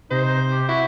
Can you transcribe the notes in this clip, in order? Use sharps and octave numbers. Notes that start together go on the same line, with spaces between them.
C3 D#4 C5
G4
E4 F#4